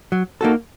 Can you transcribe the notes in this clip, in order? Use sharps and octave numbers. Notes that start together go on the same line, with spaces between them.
F#3
A#3 D#4 F#4 A4